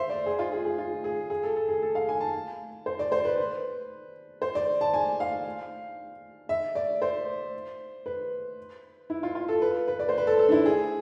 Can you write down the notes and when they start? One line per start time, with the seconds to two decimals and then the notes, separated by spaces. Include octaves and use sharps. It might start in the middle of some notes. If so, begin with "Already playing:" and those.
Already playing: C5 E5 F5
0.10 D5
0.26 G#4
0.39 F4
0.52 G#4
0.65 G#4
0.78 F4
1.04 G#4
1.30 G#4
1.43 A4
1.56 A4
1.69 G#4
1.82 A4
1.95 F5
2.09 G#5
2.21 A5
2.86 C5
2.99 D5
3.12 C5
3.25 B4
3.38 B4
4.42 C5
4.55 D5
4.81 A5
4.94 G#5
5.20 F5
6.49 E5
6.75 D5
7.02 C5
8.06 B4
9.10 E4
9.23 F4
9.35 F4
9.48 A4
9.62 B4
9.88 B4
9.99 D5
10.09 C5
10.18 B4
10.27 A4
10.39 A4
10.49 D4
10.52 E4
10.66 G#4